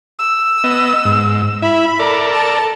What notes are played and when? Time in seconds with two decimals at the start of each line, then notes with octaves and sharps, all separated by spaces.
0.19 E6
0.64 B3 D#5
1.05 G#2
1.62 E4 E5 B5
1.99 A4 A#4 D5
2.33 A5